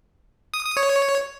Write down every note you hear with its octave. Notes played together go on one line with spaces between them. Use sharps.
D#6
D#6
C#5